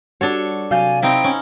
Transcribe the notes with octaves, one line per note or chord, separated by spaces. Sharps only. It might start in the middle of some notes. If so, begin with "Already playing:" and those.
G3 D4 F#4 A4 C#5
C3 F#3 F5 G#5 G6 A6
C4 D#4 E4 G5
C#4